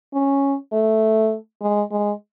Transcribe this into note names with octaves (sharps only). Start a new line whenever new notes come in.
C#4
A3
G#3
G#3